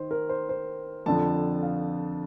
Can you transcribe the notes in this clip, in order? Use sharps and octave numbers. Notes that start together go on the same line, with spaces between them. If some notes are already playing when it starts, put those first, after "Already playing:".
Already playing: D#3 C5
A#4
C5
C5
F2 D3 F3 A5
F5